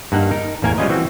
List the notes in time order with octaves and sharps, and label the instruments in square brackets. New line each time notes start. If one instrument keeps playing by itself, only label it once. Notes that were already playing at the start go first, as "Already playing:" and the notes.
[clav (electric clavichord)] G2 A#3 D#4 F#5
D#4 A#4
A1 E2 A#3 A#4 G#5
G3 G#3 C#4 F4 B4 D#5
E3 A#3 C4 F#4